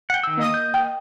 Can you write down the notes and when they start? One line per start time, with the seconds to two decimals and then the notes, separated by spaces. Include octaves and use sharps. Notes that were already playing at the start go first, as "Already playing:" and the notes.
0.10 F#5 G5
0.23 D#3 E6
0.37 A#3 D#5 D#6
0.54 G6
0.74 G5